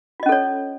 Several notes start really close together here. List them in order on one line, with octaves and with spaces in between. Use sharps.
F4 D#5 C#4 A4 C#5